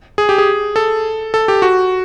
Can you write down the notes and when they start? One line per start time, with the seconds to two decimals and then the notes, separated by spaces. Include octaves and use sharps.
0.18 G#4
0.29 G4
0.38 G#4
0.76 A4
1.34 A4
1.48 G4
1.62 F#4